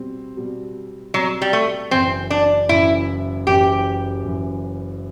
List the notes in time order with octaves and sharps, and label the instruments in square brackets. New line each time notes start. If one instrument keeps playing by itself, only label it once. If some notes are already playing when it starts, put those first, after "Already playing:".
Already playing: [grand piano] B2 G3 C4
B2 G3 C4
[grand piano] B2 G3 C4 [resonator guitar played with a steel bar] F#3
[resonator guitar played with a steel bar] G3
A3
[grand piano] F#1 F#2 E3 [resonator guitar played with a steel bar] C4
[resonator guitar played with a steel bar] D4
[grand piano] F#1 F#2 E3 [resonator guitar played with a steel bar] E4
[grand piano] F#1 F#2 E3 [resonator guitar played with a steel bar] G4
[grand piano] F#1 F#2 E3